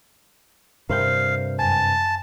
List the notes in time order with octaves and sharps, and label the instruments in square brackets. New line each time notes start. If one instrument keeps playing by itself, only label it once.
[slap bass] G2 C3 [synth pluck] A#4 C5 G6 [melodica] F5
[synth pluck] F#2 G#5 [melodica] A5